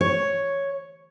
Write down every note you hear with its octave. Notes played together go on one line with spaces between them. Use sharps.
C#5